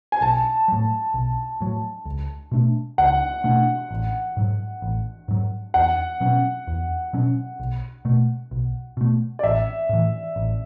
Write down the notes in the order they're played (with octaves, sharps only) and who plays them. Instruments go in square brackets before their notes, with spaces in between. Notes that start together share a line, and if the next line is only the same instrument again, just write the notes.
[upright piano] G#5
[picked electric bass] B1 [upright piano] A5
[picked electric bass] A2 F#3
B1
A2 F#3
C#2
B2 A3 D4
[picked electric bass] C#2 [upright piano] F#5
[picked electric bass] B2 A3 D4
A1
G#2 F#3
A1
G#2 F#3
[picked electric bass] E2 [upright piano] F#5
[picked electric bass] B2 F#3 C#4
E2
B2 F#3 C#4
B1
B2 A3
B1
B2 A3
[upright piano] D5
[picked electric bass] A1 [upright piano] E5
[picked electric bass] A2 E3
A1